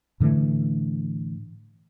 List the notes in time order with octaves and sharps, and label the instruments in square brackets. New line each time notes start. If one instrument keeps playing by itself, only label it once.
[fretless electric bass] A2 D3 E3 A3